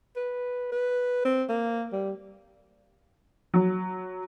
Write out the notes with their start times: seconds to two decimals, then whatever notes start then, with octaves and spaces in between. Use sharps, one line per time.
0.16 B4
0.72 B4
1.25 C4
1.49 A#3
1.92 G3
3.54 F#3